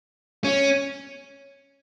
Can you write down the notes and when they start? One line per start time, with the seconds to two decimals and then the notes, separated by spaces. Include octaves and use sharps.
0.44 C#4